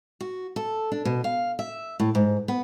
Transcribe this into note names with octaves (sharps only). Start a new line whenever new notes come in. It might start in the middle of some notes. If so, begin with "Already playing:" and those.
F#4
A4
D4
B2
F5
E5
A2
G#2
B3